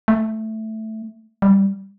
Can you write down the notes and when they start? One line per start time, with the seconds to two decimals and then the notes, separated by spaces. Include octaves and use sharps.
0.08 A3
1.42 G3